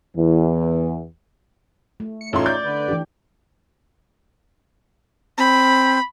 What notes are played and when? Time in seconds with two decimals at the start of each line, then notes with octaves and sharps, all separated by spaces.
0.16 E2 E3
2.00 A3
2.21 C#7
2.33 A1 D#4 F4 A4 C#5 E5 C6
2.46 D5 G6
2.64 D3 B4
2.88 E3 D4 G4
5.38 C4 B5